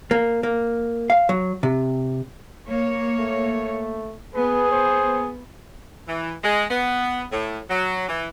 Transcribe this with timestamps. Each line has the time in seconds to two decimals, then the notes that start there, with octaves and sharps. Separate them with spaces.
0.11 A#3
0.43 A#3
1.10 F5
1.29 F#3
1.63 C3
2.67 A#3 C#5
3.19 A3
4.35 B3 G#4 B4
4.71 C5
6.08 E3
6.44 G#3
6.70 B3
7.32 A2
7.70 F#3
8.09 E3